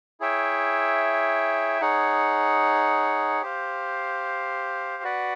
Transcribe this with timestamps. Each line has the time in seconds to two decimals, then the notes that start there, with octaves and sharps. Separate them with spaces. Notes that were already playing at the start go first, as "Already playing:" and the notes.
0.20 E4 G#4 C#5 E5 G5
1.81 D#4 G#4 C#5 F#5
3.42 G4 C5 F5
5.03 F#4 B4 D5 F#5